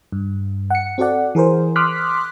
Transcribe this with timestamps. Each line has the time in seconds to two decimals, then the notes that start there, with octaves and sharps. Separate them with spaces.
0.12 G2
0.70 F#5 C#7
0.98 C4 F#4 A4 D5 F#5
1.35 E3 G#4 A#4 C5
1.76 C6 D6 D#6 F6 F#6 B6